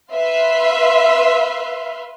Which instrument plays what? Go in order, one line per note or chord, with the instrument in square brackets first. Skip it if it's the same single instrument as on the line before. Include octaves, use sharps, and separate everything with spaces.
[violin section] B4 E5 F5 C6